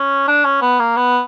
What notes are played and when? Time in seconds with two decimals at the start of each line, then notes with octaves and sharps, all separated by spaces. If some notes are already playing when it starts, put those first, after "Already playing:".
Already playing: C#4
0.28 D4
0.45 C#4
0.61 B3
0.80 A#3
0.96 B3